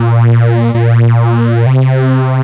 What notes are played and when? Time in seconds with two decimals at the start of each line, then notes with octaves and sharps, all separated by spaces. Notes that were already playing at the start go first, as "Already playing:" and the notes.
Already playing: A#2
0.75 A#2
1.66 C3